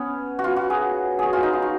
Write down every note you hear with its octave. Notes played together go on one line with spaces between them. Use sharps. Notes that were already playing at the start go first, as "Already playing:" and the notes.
Already playing: B3 C#4
F#4
F4
F#4
G#4
F#4 G#4
F4
D#4
F4
F#4